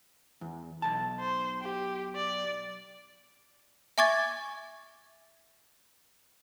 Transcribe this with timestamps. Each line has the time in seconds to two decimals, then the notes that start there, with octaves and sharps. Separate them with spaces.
0.41 E2
0.82 B1 A5
1.19 C5
1.61 G4
2.15 D5
3.98 E5 G#5 C#6 D6 G#6 A6